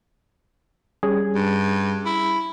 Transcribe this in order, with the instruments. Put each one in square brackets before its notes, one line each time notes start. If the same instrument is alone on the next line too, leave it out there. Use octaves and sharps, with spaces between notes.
[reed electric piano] G3 C#4 G#4
[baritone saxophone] G2
E4